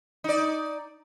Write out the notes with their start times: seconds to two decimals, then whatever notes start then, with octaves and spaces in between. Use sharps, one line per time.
0.24 D#4 D5